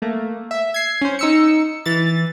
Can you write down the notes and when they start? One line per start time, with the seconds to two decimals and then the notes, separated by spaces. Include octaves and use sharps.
0.02 A3 A#3
0.51 E5
0.74 G#6 C7
1.01 C#4 C5
1.19 D#4 E6 C#7
1.86 E3 A6